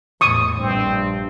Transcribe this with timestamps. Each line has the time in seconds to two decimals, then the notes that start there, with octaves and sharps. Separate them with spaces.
0.21 E2 A2 C#6 D#6
0.59 A#1 G2 C4